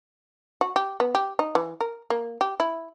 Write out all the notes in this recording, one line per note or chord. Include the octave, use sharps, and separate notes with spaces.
F#4
G4
B3
G4
D#4
E3
A#4
A#3
G4
E4